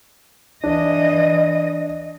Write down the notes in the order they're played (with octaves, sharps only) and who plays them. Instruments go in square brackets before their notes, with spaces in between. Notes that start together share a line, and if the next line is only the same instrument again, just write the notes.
[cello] E3 D#5 [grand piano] D4